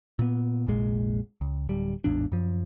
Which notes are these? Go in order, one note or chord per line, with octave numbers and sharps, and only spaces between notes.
A#2 B3
F1 A#1 A#2 G#3
C#2
D1 G3
A1 E2 G#2 D4
F#2 F3